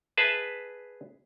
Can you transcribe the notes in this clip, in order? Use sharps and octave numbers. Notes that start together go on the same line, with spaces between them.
G#4 B4 E5 A5